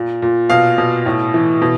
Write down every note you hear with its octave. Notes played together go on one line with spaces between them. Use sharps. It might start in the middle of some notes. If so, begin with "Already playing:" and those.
Already playing: A#2
A#2
B2 F5
B2
A2
E3
B2